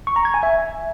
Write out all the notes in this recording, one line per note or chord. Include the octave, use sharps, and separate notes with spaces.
C#6
A#5
G#6
G#5
E5